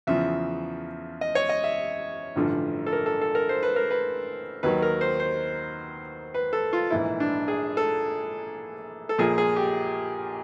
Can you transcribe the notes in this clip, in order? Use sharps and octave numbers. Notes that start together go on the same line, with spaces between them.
E2 C#3 F3 E5
D#5
C#5
D#5
E5
A1 G2 D3 F3
A4
A#4
A4
A4
A#4
C5
B4
A#4
B4
D#2 D#3 F#3 B4
A#4
C5
C5
B4
A4
F4
A#1 G#2 E3 E4
D4
G#4
A4
A4
A#1 A#2 F3 G#4
G#4
G4